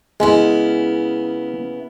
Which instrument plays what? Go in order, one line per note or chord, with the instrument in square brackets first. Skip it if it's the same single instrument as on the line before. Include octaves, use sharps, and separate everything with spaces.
[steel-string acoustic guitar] C#3 B3 E4 [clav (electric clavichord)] G#3